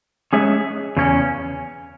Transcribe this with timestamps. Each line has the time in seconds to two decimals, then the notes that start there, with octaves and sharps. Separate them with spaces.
0.33 G#3 C#4 G#4 C#5 E5
0.97 E2 C#3 C#4